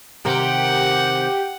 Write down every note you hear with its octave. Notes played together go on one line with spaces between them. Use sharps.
C3 D#3 G4 A#4 F#5 G5